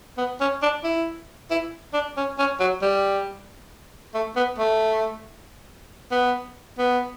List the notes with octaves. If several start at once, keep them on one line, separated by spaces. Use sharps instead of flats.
B3
C#4
D4
E4
E4
D4
C#4
C#4
F#3
G3
A3
B3
A3
B3
B3